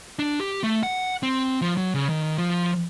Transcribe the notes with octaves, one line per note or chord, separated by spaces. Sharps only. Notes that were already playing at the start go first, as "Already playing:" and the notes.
D4
G4
A3
F#5
C4
F3
F#3
C#3
D#3
F3